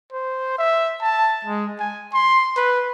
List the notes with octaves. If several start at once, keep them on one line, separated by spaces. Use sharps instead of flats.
C5
E5
A5
G#3
G#5
C6
B4